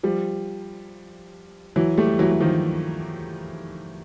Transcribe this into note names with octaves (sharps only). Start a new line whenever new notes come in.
F3 G3
E3 F#3
G3 A3
E3 F#3
F#3
D#3 F3